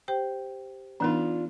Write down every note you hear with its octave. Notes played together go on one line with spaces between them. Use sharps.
G4 C5 G5
E3 B3 D4 D#4 F4